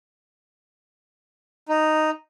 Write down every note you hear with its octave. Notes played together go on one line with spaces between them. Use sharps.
D#4